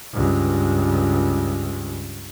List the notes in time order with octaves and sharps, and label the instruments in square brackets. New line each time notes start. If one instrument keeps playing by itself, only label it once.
[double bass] C#2 G2